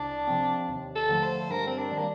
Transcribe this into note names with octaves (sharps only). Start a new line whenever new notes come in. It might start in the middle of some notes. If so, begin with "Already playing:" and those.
Already playing: C2 D4
C3 F3 C4
D#2
A4
D3 F3 A3
C5
G2 A#4
C4
D4
D#3 G3
A#3